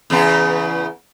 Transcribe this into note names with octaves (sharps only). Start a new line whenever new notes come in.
E2 C#3 B3